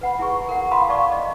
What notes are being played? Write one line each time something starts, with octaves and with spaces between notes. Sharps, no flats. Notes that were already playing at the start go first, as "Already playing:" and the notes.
B4 F#5 B5
E4 G#4 C#6
A#4 F#5
F5 A5 B5 C6 D#6
D5 F5 A5 C#6 D6
D#5